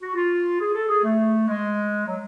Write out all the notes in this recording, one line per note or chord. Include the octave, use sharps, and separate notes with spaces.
F#4
F4
G#4
A4
G#4
A3
G#3
F#3